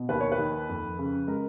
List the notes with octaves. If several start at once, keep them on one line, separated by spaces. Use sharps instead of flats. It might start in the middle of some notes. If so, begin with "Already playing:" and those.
Already playing: B2
D#2 B4
C#5
B4
D#3
F2
C#3
G#3 A#4